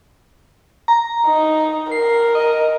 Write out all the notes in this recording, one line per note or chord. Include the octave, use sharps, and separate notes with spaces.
A#5
D#4
A#4 C7
D#5